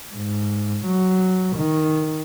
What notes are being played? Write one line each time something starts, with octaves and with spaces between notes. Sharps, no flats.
G#2
F#3
D#3